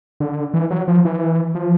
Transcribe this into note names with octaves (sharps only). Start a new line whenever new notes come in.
D3
E3
F#3
F3
E3
F3